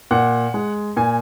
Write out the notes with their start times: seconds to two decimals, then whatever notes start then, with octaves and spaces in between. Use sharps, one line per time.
0.11 A#2 F#5
0.54 G#3
0.96 A#2 G#5